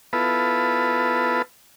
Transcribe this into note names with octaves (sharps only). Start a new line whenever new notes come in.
B3 E4 F4 A4 B4